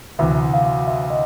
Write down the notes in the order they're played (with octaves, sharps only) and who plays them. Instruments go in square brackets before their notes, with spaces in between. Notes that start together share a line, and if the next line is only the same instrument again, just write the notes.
[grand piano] D2 C3 E3 [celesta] E5
[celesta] F5
E5
D#5